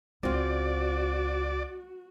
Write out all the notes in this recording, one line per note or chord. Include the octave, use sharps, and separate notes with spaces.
C#2 C4 F4 F#4 D5